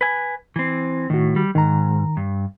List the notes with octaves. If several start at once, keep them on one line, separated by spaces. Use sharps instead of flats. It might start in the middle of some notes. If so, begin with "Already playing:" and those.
B4 G#5
E3 C4
A2 D#3 F#4
G3
G#2 D#3 A#5
G2